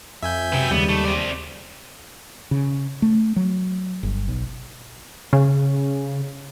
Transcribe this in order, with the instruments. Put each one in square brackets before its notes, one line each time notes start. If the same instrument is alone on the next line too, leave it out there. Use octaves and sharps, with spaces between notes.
[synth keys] F2 [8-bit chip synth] E5 G#5 G6
[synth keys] F#2 C3 [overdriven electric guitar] B4 G5
[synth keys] D#2 C#3 G#3 [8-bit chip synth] G3 [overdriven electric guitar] B3
[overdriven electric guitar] A3
C4 D5
[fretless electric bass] C#3
A3
F#3
G1
B1
[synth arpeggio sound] C#3